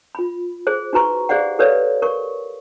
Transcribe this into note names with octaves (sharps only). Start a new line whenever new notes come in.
F4 B5
G#4 C5
D#4 F#4 B4 A#5 C#6
G4 G#4 C5 D5 F5 F#5
G4 A4 B4 C#5 D5 F5
A#4 C#6